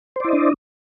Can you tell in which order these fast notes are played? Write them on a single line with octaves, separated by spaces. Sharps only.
C5 D5 E4 D#5 D4